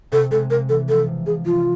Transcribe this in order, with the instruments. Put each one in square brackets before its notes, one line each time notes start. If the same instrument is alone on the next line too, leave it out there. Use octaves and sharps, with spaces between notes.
[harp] C3 [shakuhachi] A4
[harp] G#3 [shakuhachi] A4
[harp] G#3 [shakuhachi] A#4
[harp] E3 [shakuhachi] A4
[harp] F3 [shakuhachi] A4
[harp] C3
[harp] F3 [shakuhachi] G#4
[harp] F3 [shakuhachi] F4